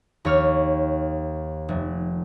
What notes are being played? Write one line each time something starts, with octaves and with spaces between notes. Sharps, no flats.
D#2 C#5 F6
F1